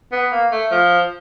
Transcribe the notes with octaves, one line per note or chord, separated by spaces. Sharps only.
B3
A#3
A3
F3